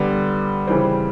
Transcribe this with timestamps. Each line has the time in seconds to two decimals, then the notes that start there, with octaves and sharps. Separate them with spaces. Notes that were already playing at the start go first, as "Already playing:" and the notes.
Already playing: D3 G3 B3
0.67 C#3 E3 G3 C4